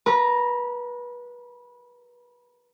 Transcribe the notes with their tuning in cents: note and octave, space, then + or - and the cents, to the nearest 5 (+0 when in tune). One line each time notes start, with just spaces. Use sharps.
B4 -25 A#5 +0